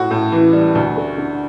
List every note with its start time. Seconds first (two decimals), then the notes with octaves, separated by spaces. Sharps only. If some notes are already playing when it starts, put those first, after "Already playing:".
Already playing: A2 F#4
0.11 A2
0.32 E3
0.53 G3
0.75 D2
0.97 A3
1.17 D3